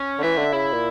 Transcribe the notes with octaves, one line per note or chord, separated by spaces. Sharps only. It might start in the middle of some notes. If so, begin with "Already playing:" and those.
Already playing: C#4
D3
E3 E5
D3
C#3 E4
A#2